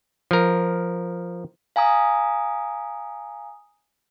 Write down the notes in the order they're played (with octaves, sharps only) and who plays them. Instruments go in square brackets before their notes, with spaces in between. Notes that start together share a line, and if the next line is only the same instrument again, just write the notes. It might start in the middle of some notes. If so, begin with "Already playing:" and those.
[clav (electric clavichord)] F3 A#4
[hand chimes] F5 G#5 A#5 D#6